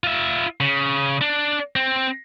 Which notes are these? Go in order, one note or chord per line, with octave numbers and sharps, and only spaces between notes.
F4 E5
C#3
D4
C4